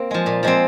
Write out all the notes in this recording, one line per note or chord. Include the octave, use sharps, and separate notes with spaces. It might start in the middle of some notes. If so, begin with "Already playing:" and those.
Already playing: A#3 C4
F3 G#3
A#2
F3 G#3 C4